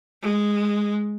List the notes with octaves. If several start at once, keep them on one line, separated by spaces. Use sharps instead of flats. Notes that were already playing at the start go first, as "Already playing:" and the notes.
G#3